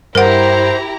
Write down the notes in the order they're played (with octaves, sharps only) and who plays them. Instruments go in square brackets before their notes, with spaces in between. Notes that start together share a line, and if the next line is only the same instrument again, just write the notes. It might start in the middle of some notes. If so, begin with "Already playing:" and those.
[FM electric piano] G2 [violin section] E4 G4 A#5 [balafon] A#4 F#5 [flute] C5